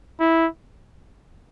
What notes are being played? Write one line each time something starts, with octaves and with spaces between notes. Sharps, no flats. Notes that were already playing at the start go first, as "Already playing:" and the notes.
E4